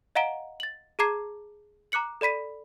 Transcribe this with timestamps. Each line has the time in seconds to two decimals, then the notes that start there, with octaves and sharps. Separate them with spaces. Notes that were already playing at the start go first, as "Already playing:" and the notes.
0.15 D#5 F5 F#5 A#5 D7 G7
0.60 A6 F#7
0.99 G#4 A5 A#5 D6 G#6 C7
1.92 A#5 D6 F#6 C#7 F#7
2.21 A4 D5 B5 B6 D#7